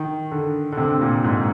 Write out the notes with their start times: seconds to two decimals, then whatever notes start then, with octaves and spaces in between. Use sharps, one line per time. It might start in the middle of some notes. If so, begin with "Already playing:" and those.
Already playing: D#3
0.31 D3
0.72 D3
0.77 C3
1.01 A#2
1.24 G#2